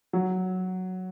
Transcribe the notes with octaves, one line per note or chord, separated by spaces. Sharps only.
F#3